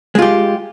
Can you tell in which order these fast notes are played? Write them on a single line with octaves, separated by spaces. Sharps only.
G#3 F4 G4